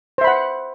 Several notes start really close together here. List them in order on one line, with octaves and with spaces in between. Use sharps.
C5 E5 B5 F#5